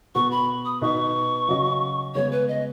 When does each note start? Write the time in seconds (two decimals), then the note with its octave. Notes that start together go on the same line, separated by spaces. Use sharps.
0.15 B2 B3 F#4 C#6
0.31 B5
0.65 D#6
0.82 B2 B3 D#4 B4 D#5 C#6
1.48 C#3 F#3 C#4 F#4 D#5
2.15 C#3 G#3 B3 C#5
2.32 B4
2.48 D#5